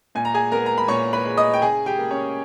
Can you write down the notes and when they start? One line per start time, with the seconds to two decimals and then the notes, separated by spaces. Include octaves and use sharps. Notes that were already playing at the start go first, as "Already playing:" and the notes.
0.15 A#2 G#5
0.25 A#5
0.34 G#4 G#5
0.52 B3 A#4 A#5
0.66 A#5
0.78 B5
0.88 A#2 C#5 C#6
1.13 B4 B5
1.25 G#3
1.37 D#5 D#6
1.54 G5
1.62 C#3 G#4 G#5
1.86 G4 G5
1.98 A#3
2.11 C#4 C#5